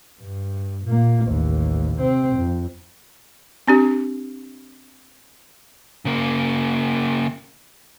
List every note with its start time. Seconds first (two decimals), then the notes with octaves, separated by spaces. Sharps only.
0.21 G2
0.85 A#2 A#3
1.26 A1 D#2
1.99 C3 C4
2.37 F2
3.67 C4 D4 G4
6.05 C#3 A#3